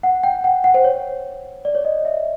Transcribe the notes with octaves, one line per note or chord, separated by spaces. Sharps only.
F#5
G5
F#5
F#5
C5
C#5
D5
C#5
D#5
E5